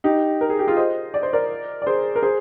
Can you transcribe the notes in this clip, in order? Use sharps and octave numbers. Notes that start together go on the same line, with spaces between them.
D#4 G4
A#4
G#4
G4
F4 G#4
C5 D#5
D5
C5
A#4 D5
D5
G#4 C5
A#4
G#4 C5